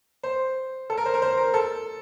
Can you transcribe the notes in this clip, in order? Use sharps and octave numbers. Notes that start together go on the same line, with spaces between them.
C5
A4
A#4
C5
A#4
C5
A#4
A4